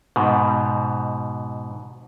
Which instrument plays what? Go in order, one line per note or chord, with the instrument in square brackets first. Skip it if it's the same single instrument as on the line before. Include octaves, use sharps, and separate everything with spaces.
[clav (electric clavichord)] G#2 B2